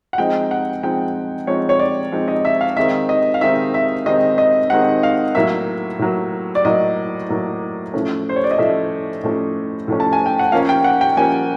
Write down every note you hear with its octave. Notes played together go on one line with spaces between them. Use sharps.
F#5
F3 G#3 C4 D#4 G5
F#5
F3 G#3 C4 D#4 G5
F3 G#3 C4 D#4 C#5
C#5
D5
F3 G#3 C4 D#4
D#5
E5
F5
D#3 G#3 C4 D#4 E5
D#5
F5
D#3 G#3 C4 D#4 E5
E5
D#3 G#3 C4 D#4 D#5
D#5
D#3 G#3 C4 D#4 F#5
F5
A2 F#3 A#3 E5
A2 F#3 A#3
D5
A2 F#3 A#3 D#5
A2 F#3 A#3
A2 F3 A3 C#4
C5
C#5
D5
D#5
A2 F3 A3 C#4 E5
A2 F3 A3 C#4
A2 F3 A3 C#4
A5
G#5
G5
F#5
F3 A#3 C#4 F5
G5
F#5
G5
F3 A#3 C#4 G#5